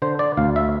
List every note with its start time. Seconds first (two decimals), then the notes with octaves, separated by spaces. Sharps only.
0.02 D3 C5
0.19 D5
0.37 D2 F5
0.56 E5